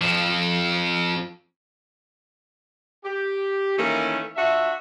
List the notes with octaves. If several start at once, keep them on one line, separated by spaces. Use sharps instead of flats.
F2 F3
G4
D#3 E3 A3 A#3 C#4
D4 F4 F#4 E5